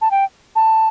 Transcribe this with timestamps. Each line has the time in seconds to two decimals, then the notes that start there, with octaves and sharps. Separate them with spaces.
0.01 A5
0.11 G5
0.56 A5